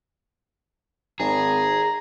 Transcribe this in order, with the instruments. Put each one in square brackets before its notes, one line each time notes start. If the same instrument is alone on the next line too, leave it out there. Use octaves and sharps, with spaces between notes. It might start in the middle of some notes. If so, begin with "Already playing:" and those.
[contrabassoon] G#1 [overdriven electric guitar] G#4 [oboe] A#5